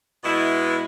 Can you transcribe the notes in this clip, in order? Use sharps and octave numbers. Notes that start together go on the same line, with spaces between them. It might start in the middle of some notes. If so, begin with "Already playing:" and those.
B2 G#3 B3 E4